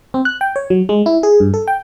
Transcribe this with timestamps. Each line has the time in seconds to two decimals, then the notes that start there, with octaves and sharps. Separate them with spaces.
0.14 C4
0.25 F#6
0.41 G5
0.56 C#5
0.70 F#3
0.89 G#3
1.06 E4
1.23 G#4
1.40 G2
1.54 A4
1.68 G5